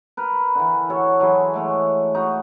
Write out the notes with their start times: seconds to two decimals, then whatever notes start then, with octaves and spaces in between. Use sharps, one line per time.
0.17 A#4 B4
0.55 D3 E3
0.90 F#4 A4 C#5
1.20 E3 F#3 G#4 C6
1.54 G#3 A3 C#5
2.15 D#4 F#4